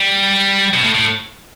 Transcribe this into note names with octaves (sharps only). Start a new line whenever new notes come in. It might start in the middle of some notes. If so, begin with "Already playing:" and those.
Already playing: G3
B2
A2
A2